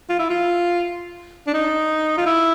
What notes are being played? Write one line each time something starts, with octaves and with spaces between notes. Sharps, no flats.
F4
E4
F4
D4
D#4
F4
E4